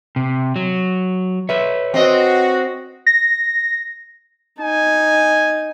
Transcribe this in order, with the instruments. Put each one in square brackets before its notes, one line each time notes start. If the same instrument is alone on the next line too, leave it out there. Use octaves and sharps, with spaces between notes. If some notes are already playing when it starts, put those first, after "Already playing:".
[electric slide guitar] C3
F#3
[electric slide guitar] B4 C#5 [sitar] E5
[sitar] C4 D#5 [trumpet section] F#4
[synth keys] A#6
[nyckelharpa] D#4 [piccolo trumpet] G#5